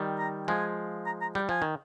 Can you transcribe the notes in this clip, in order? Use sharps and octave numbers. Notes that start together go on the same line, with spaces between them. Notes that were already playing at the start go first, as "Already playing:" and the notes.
Already playing: D#3 G3
A#5
F3 G#3 G#5
A#5
A#5
G3 G5
F3 G#5
D#3